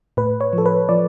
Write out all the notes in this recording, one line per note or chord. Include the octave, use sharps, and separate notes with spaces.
A2 B4
C#5
F3
A4
B4
F3 D5